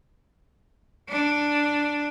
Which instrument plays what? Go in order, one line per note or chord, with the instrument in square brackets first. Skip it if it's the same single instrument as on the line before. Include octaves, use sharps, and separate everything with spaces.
[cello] D4